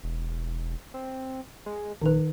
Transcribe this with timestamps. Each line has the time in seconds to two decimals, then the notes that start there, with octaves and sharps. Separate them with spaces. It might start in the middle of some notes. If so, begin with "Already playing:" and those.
0.04 E1
0.94 C4
1.66 G#3
2.01 A#1 D#3 D#4 B4